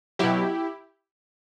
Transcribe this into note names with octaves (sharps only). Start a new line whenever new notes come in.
B2 F#3 E4 G4